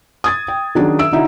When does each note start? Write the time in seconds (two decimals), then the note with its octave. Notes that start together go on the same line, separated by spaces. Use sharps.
0.24 D#6 G#6 A6
0.48 G5
0.75 D#3 F#3 C#4 D4 G#4
0.99 E5 E6 D7
1.12 D3 D#4 E4 F#4